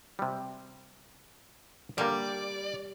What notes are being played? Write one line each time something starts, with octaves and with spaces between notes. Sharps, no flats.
C3 G3
D3 G3 A#3 D5